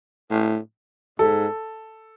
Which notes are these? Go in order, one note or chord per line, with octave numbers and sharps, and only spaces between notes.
A2
G#2 A4